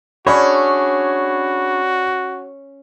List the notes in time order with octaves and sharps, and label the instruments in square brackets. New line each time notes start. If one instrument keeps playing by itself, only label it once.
[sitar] C#4 [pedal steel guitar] D4 G#4 C#5 [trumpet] F#4 [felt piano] D5 B5